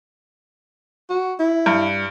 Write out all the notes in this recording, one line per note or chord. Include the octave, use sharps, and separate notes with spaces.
F#4
E4
G2